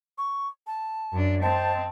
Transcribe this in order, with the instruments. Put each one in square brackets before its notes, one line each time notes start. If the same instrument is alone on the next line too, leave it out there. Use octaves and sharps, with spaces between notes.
[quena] C#6
A5
[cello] F#2 D4
[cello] C4 [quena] C5 [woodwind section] D#5 G5 A5